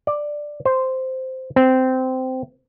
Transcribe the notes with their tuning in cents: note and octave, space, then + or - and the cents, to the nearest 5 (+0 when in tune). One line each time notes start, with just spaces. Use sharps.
D5 +5
C5 -5
C4 -15